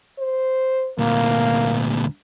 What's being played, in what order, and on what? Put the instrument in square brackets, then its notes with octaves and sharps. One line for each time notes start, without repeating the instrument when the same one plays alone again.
[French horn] C5
[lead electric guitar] D2 A#2 [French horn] A#3